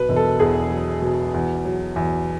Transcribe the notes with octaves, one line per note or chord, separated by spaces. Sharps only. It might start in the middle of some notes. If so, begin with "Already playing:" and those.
Already playing: B2 F#3 B4
E1
A4
E2 G#4
F#3
B2
E2
F#3
E2